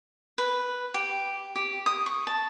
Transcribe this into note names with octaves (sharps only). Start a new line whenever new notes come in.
B4
G4
G4
D#6
C#6
A5